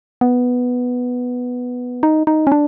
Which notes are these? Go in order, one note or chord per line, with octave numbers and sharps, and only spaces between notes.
B3
D#4
D#4
C#4
D4